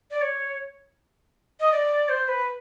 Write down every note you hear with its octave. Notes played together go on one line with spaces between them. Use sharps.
D5
C#5
D#5
D5
C5
B4